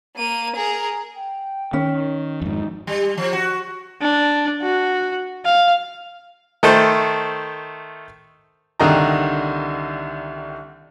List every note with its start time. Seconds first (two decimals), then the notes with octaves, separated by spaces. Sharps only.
0.16 A#3 D#7
0.56 G#4 A#4
1.15 G5
1.73 D#3 C#4
2.42 F2 G#2 D#4
2.87 G3
3.17 F3
3.33 F#4
4.01 D4
4.62 F#4
5.45 F5
6.63 D#3 A3 A4 C5
8.80 C2 D3 D#3 D#5 G5 A#5